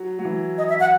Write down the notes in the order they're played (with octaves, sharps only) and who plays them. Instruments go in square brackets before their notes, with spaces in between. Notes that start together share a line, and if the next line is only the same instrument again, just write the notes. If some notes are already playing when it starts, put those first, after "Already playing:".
Already playing: [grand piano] F#3
F#3
E3
[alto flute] D#5
E5
F#5